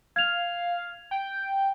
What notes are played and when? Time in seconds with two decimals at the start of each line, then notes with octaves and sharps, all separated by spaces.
0.16 F5 G#6 F7
1.11 G5